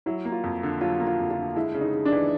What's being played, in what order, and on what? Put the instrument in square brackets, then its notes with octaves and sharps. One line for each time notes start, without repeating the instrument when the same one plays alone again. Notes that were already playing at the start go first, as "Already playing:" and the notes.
[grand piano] F#3 [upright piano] E4
[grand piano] A#3
[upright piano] F4
[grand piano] F2
D3
[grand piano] F#3 [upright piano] F4
[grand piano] A#3
[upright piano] F4
[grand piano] F2
[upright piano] F4
[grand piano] D3
[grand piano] G#3 [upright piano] E4
[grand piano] C#3
[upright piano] D#4
[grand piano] C#3
[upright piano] D4
[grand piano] E3